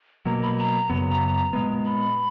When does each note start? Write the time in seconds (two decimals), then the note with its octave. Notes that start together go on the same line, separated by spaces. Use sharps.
0.25 B2 F#3 A#3 A#5
0.42 B5
0.58 A#5
0.90 F#2 C#3 F#3 B3
1.53 A#2 G#3 B3
1.85 B5